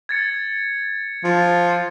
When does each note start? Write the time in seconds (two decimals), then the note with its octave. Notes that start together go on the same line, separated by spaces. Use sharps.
0.09 G#6 A6 C#7
1.24 F3